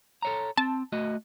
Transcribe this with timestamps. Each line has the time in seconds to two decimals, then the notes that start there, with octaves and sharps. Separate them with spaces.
0.22 A4 C#5 A#5
0.58 C4 A5
0.92 A3 F#4 D#5